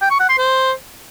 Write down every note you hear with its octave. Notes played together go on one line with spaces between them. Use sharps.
G5
C#6
F#5
C6
C5